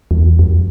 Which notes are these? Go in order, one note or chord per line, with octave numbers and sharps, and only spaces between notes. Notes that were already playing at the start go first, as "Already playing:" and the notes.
E2
F2